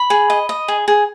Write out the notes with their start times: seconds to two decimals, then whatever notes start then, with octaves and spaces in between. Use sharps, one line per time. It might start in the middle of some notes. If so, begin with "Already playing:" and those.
Already playing: B5
0.10 G#4
0.30 D#5
0.49 D#5
0.68 G#4
0.88 G#4